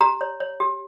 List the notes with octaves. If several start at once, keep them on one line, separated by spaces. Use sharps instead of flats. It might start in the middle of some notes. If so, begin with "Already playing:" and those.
G4 A#5
C#5
C#5
G4